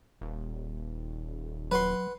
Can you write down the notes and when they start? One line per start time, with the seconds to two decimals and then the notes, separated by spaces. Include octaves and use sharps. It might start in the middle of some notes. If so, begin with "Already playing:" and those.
0.21 D#1
1.71 F#3 B4 F#5 C6